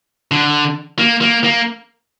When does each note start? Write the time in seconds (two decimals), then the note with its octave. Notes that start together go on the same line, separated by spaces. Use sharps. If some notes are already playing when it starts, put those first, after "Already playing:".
0.31 D3
0.99 A#3
1.21 A#3
1.44 A#3